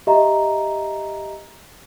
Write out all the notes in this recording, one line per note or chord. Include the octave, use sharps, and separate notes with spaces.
G4 D#5 E5 A#5